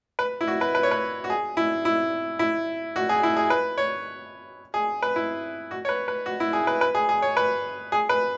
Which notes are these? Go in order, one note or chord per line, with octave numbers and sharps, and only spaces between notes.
B4
E4
F#4
B4
B4
C#5
B4
F#4
G#4
E4
E4
E4
F#4
G#4
E4
G#4
B4
C#5
G#4
B4
E4
F#4
C#5
B4
B4
F#4
E4
G#4
B4
B4
G#4
G#4
C#5
B4
G#4
B4